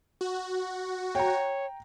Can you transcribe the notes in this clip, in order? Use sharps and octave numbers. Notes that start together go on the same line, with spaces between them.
F#4
C#5 G5 A#5